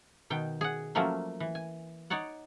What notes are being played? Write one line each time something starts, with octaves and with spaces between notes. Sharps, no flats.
B2 D#3 G5
G#4 F#5
F3 F#3 A3 A#3 C#4
E3
G#5
D#4 C#5 D5 F#5